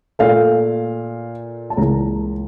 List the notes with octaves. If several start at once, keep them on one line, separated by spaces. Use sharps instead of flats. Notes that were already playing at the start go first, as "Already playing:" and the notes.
A#2 A3 F5
A5
C#2 C#3 E3 A#3 A#5